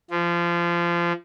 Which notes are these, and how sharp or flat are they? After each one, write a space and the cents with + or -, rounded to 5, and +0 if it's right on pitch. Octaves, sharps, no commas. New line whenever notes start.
F3 -25